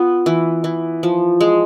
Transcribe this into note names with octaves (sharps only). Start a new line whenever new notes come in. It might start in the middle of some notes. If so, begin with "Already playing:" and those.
Already playing: B3 F4
E3
E3
F3
G#3